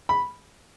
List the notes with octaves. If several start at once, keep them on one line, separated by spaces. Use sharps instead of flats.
B5